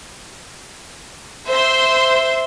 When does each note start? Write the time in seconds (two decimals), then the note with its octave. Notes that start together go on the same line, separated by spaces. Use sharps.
1.49 C5 E5 C6